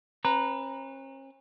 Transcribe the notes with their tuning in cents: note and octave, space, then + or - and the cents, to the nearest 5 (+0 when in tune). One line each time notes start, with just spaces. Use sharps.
C#4 -45 B4 +0 A#5 +0